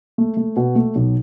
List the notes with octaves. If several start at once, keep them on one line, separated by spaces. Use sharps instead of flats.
A3
A3
B2
A3
B1